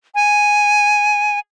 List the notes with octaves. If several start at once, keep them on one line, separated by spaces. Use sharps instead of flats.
G#5